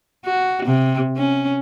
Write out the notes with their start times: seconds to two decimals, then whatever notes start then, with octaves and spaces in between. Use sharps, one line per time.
0.25 F#4
0.65 C3
1.17 C#4